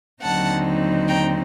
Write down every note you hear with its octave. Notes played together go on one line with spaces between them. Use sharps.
D#2 D3 F#3 C4 D#4 F#5 A5
G5 A#5